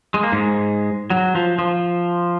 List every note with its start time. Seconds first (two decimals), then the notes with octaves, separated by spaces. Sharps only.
0.14 G#3
0.23 A#3
0.32 G#2 G#3
1.10 F#3
1.35 F3
1.59 F3